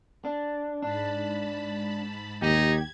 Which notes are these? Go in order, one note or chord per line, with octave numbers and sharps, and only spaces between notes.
D4
G#2 D4 A5 B5
D#2 D#4 G4 G#6